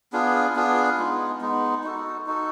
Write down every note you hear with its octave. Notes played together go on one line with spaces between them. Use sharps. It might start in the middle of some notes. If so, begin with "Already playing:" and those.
B3 D4 F4 G#4
B3 D4 F4 G#4
G#3 B3 D#4
G#3 B3 D#4
D#4 F#4 A4
D#4 F#4 A4